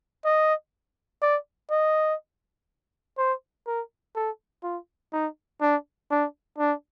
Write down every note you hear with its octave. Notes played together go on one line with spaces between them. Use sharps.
D#5
D5
D#5
C5
A#4
A4
F4
D#4
D4
D4
D4